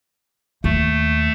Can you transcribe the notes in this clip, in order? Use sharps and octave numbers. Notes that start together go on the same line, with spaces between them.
D#2 A3